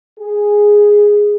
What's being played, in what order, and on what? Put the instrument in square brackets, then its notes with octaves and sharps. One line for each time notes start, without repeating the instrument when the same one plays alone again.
[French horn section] G#4